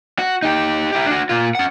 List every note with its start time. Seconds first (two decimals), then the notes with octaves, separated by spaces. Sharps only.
0.19 F#4
0.43 D#4 G4
0.93 E4 G4
1.06 D4 F#4
1.29 A#2 F4
1.55 C#4 F#5